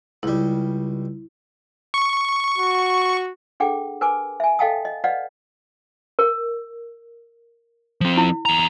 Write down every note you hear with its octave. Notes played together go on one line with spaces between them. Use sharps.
C#2 G3 E4
C#6
F#4
D4 G#4 A4 F#5 G5 D6
A#4 B4 G#5 D6
E5 G#5
A4 D#5 F5 G5 A5 D#6
D#5
B4 D5 D#5 F5 F#5
A#4
F3 C4
E4
E2 A#5